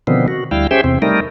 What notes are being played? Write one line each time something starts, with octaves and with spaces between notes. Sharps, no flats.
B2 D3 D#3 F3 B3 C4
F#4
D2 G3 E4 F5 G5
C#4 G4 G#4 C5 E5 G5
E2 C3 C4
G3 A3 D#4 A#4